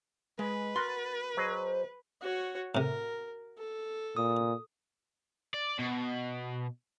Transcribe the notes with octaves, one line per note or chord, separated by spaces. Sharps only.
G#3 G#4 B4 D#5
F#4 A#4 F#5 C6 A6
F#3 G#4 C5 D#5
F#4 C#5
A2 C3 A#4
A4
A#2 D#6
D5
B2